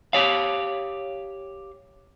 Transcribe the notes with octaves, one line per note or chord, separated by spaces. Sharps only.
G4 C#5 F5